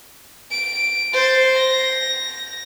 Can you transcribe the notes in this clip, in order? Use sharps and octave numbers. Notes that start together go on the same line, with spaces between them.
D7
C5 A6
A#6